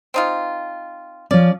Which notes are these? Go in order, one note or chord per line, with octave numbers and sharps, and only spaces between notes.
C4 D#4 F4
F3 C#4 D5